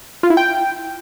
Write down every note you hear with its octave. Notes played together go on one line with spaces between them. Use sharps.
F4
E4
G5